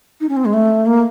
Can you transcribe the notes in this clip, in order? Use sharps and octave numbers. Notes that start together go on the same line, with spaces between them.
D#4
C#4
C4
G#3
A3
A#3